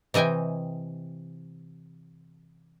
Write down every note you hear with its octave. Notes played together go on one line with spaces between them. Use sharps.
C3 E3 D#5 G5 G#5